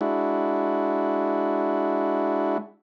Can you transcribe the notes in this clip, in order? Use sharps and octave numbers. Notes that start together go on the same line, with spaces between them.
G#3 D4 E4 F#4